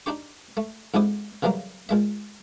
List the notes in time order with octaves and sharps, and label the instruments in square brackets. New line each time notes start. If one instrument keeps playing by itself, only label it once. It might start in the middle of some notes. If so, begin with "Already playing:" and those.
[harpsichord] D4 D#4 G4 C#6
A3
F2 G#2 E4 G4 D#6
C#3 E3 F#3 G3 A#3
A#2 G#3 E5